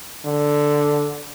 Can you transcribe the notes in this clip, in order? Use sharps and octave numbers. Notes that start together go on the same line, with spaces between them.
D3